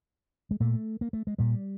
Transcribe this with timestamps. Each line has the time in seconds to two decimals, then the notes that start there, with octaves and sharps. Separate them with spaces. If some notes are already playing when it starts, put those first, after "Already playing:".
0.51 G#3
0.60 A#2 A3
1.01 A#3
1.13 A3
1.27 G#3
1.38 A#2 G3